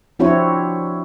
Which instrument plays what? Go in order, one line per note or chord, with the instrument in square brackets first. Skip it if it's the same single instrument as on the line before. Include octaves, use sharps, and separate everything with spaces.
[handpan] F3 C4 D4 E4 F#4 C#5